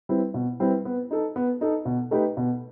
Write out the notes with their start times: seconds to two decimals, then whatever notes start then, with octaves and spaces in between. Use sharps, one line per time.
0.09 G3 C4 E4 B4
0.34 B2
0.60 G3 C4 E4 B4
0.85 B3
1.11 D#4 A4
1.36 B3
1.61 D#4 A4
1.85 B2
2.11 A3 D#4 G4 B4
2.37 B2